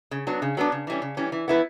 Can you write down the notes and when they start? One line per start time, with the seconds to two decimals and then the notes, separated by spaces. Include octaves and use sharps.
0.11 C#3
0.27 F#3 B3 D4
0.42 C#3
0.57 F#3 B3 D4
0.72 C#3
0.87 E3 G3 C#4
1.02 C#3
1.17 E3 G3 C#4
1.32 E3
1.48 B3 E4 B4